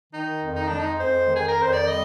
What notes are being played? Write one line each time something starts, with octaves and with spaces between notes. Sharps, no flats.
D#3 D#4
F2
D#4
G#3 D4
D#4
F2 C5
D#3
G#4
A#4
F2 C5
D5
G3 D#5